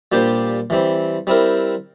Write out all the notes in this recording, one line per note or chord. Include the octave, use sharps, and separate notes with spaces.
A#2 G3 D4 G4 C5
E3 G3 C4
G3 C4 E4 A#4